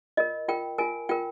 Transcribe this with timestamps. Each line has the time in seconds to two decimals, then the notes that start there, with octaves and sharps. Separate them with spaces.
0.17 F4 A#4 D#5
0.48 F4 A#4 G5
0.78 F4 A#4 G#5
1.09 F4 A#4 G5